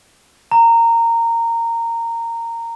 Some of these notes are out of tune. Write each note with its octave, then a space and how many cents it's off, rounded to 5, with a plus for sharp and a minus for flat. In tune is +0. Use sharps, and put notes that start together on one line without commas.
A#5 -15